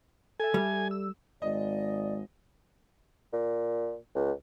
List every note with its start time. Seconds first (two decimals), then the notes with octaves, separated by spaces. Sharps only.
0.40 A4 E5 G#5
0.54 G3
0.91 E6
1.42 G#1 G#3 D5 D#5
3.33 A#2
4.15 C#2